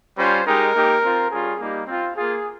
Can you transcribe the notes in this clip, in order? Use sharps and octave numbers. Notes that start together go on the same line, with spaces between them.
G3 C#4 F4 C5
G#3 D#4 G4 A#4
A#3 D#4 G4
C4 F4
G3 C#4 F4 G#4
G3 A#3 D#4 G4
C4 F4
A#3 F4 G#4